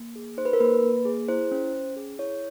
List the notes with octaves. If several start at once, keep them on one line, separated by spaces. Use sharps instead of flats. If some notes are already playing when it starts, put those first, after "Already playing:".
Already playing: A#3
G#4
D#4 C5
B4
A#4
A#3 B4
A#3
G#4
E4 C5
C#4
C#4
G#4
E4 C#5